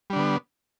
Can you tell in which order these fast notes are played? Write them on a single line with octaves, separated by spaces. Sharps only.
G3 D4 D3 B3